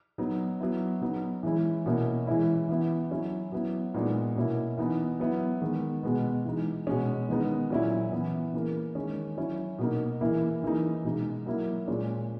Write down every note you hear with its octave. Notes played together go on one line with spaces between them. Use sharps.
F#3 B3 D#4
F#3 B3 E4
C#3 F#3 B3 D#4
E3 G#3 C#4 E4
B2 A#3 C#4 E4
E3 G#3 C#4 E4
E3 B3 E4
F#3 C#4 E4
F#3 B3 E4
A#2 G#3 B3 D#4
B2 A#3 C#4 E4
E3 B3 D#4
F#3 B3 E4
D#3 G#3 B3
B2 G#3 B3
E3 G#3 D#4
B2 G#3 C#4
D#3 G#3 B3 D#4
A#2 F#3 C#4 E4
E3 B3 E4
C#3 E3 A#3
D#3 G#3 C#4
F#3 C#4 E4
B2 A#3 D#4
C#3 E3 A#3 E4
C#3 E3 A#3 D#4
B2 G#3 D#4
F#3 A#3 E4
A#2 G#3 C#4